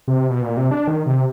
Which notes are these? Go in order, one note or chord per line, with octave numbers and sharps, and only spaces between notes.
C3
B2
A#2
C3
D4
D#3
C3